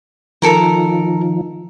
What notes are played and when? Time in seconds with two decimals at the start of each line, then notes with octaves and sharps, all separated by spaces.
0.42 D#3 F3 A4 A#4 A#5